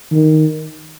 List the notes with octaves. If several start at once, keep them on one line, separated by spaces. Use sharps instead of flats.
D#3